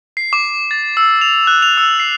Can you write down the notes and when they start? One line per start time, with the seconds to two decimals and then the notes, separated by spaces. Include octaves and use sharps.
0.17 C7
0.33 D6
0.71 A6
0.97 E6
1.21 F7
1.47 F#6
1.62 F7
1.77 E6
2.00 C7